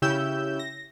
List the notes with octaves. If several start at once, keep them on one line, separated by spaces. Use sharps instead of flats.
C#3 C#4 E4 G4 E6 G6
A#6